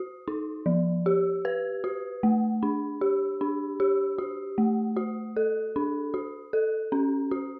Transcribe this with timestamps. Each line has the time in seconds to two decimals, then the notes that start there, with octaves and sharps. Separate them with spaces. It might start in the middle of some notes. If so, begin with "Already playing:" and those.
Already playing: F#4
0.28 D#4
0.66 F3
1.06 G4
1.45 B4
1.84 F#4
2.23 A3
2.63 D4
3.01 G4
3.41 D4
3.80 G4
4.18 F#4
4.58 A3
4.97 F#4
5.37 A4
5.76 D4
6.14 F#4
6.53 A4
6.92 C#4
7.31 F#4